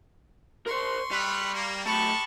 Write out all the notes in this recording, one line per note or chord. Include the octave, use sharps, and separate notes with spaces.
A#4 C5 C6 C#6
G3 A3 B4
A#3
F#3 G#3 A3 G4 A5 B5 C#6